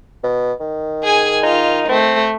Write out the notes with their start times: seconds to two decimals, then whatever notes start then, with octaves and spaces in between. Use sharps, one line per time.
0.23 B2
0.60 D#3
1.04 G#4 G#5
1.43 D#4 F4
1.89 A3 C4